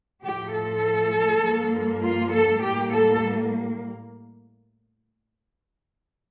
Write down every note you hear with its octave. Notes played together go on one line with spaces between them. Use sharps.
A2 F3 A3 G4
A4
G2 F3 A#3
F4
A4
A2 G3 A#3 G4
A4